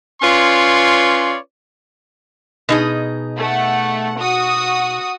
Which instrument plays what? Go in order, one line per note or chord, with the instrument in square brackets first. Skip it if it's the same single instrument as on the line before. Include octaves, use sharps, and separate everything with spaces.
[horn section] C#4 F4 B4 C#5 D5 C6
[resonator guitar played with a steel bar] B2 D#4 G#4
[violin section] A3 F#5
F#4 D#6